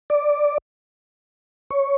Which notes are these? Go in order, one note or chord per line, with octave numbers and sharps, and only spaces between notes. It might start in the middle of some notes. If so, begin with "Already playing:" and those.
D5
C#5